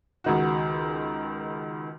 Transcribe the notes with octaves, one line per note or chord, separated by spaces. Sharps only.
C#2 D#3 F#4